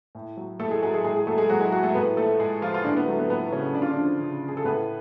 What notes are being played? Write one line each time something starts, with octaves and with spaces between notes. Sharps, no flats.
A2
F#3
A2 A3 A4
G#3 G#4
F#3 G#3 G#4
G#3 G#4
A2 G#3 G#4
G#4
F#3 A3 A4
G#3 G#4
A2 F#3 F#4
G#3 G#4
F#3 F#4
A3 A4
A2 B3 B4
F3 A3 A4
A2 G#3 G#4
F3 F4
F4
A2 D3 D4
B3
F#3 A3
B3
A2 B3
C#3 F#3 C#4
C#3 D4
F4
D3 D4
F3
C#3
F3
G#4
A4
A2 B3 B4